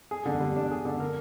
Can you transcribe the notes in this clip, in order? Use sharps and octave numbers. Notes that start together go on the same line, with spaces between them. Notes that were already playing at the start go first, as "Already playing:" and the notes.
G#4
D3
G3
D4
G#4
D3
A#4